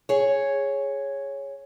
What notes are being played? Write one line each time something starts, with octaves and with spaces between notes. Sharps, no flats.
G#4 C#5